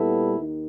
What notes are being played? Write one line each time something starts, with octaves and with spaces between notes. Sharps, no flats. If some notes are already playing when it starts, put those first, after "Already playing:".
Already playing: A#2 G3 B3 E4 A4
D#2 D#3